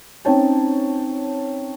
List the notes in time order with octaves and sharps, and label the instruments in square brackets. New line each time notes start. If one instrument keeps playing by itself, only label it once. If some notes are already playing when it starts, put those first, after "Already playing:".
[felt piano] C4 C#4 D#4 C#5 G5 A5